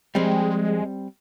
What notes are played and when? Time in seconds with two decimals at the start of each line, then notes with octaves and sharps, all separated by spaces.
0.15 F3 G3 G#3 C4